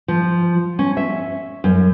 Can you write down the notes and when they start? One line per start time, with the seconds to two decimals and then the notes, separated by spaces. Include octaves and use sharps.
0.08 F3
0.79 C#4
0.97 E5
1.64 F#2